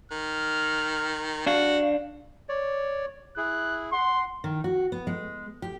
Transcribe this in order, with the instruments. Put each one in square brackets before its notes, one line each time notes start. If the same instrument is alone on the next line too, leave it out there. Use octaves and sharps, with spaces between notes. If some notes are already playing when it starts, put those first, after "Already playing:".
[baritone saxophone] D#3 [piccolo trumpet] F6
[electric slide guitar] D4 F5 [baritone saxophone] F#4
[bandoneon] C#5 D5
[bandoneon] E4 G#4 [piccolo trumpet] F#6
[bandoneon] F#5 [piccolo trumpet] C6
[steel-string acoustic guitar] D#3
F#4
B3
G#3
G4